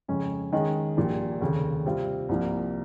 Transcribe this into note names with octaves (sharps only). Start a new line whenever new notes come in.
F2 C#3 G#3 C#4
D#3 G#3 C#4 G#4 D#5
A#1 A#2 G3
F1 D#2 C#3
C3 G3 C4 F4
C2 C3 F3 A#3